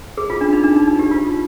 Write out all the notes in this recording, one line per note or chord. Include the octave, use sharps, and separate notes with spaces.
G#4
F4
D4
D#4
D4
D#4
D#4
G4
F4